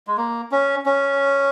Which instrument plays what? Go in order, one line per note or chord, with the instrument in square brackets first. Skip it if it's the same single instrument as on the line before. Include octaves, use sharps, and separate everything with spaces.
[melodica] G#3
A#3
C#4
C#4